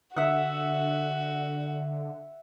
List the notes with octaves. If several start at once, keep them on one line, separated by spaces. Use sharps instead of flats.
D3 F#4 E5 F#5